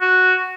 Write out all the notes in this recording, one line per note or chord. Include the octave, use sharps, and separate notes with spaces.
F#4